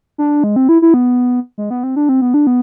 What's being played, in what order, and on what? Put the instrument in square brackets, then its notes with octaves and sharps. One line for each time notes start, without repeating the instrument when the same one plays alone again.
[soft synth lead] D4
G#3
C4
E4
E4
B3
G#3
B3
C4
D4
C4
B3
D4
B3